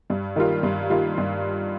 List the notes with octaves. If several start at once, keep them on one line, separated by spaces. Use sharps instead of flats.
G2
D#3 G3 A#3 F4
G2
D#3 G3 A#3 F4
G2